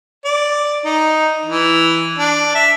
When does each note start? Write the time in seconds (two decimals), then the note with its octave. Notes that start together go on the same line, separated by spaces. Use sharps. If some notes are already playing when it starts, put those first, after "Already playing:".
0.24 D5
0.85 D#4
1.46 E3
2.18 D4
2.55 E5